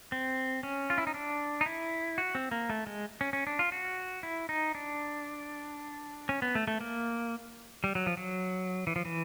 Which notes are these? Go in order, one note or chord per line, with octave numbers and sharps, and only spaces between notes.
C4
C#4
F4
E4
D#4
D4
D#4
E4
F#4
C4
A#3
A3
G#3
C#4
C#4
D4
F4
F#4
E4
D#4
D4
C#4
B3
A3
A3
A#3
G3
F#3
F3
F#3
E3
F3
E3